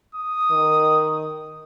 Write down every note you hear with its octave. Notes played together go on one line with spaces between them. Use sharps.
D#6
D#3